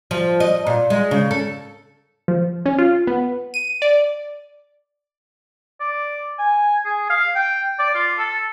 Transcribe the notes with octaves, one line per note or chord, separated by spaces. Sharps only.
F3
D#5
A#2
G#3
C#3
A4
F3
C#4
F4
B3
D#7
D5
D5
G#5
G#4
F5
G5
D5
F4
A4